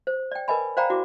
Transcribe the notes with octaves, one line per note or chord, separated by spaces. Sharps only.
C5
D5 G5
A#4 B4 D#5 G#5 B5
C5 D5 F5 G5 A#5 B5
E4 F#4 D6